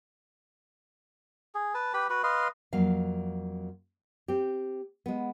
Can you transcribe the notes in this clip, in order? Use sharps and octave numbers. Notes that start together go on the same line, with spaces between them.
G#4
B4 A5
G4 B4 B5
F#4 B4 F#5
B4 D#5 F5 C6
F2 F#3 A#3 F5
C4 G4
G#3 B3